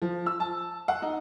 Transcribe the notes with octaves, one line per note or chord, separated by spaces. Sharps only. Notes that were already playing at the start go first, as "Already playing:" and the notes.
F3
E6
A5
F#5
D#4